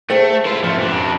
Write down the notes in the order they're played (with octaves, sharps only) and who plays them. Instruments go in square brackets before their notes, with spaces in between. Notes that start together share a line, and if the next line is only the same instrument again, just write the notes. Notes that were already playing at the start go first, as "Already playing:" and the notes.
[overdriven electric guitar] A3 [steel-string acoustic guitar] G#4 C5 G5
[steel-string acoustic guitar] G#3 B4 [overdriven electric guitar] E4 F4
[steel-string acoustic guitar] G#2 C#4 [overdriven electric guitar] F3 A3
[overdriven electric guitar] F2 D4